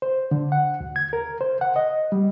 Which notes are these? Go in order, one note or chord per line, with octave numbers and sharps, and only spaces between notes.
C5
D3
F#5
D2
G#6
A#4
C5
F#5
D#5
G3